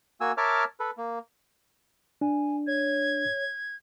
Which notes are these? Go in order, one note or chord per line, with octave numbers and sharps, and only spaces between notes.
A#3 F#4 G#5 E6
A#4 C#5 E5 A5 D6 F6
A4 B4
A#3
D4 G#5
C#5 G#6